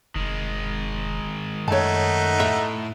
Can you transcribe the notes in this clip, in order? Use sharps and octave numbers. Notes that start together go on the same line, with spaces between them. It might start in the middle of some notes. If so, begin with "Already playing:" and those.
F1 D#3 G#3
F#2 A3 D#4 C#5 F#5 A5
A2 E5